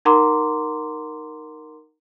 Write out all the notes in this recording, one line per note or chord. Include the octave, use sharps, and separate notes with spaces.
D#4 A#4 F#5 A#5 C6 D6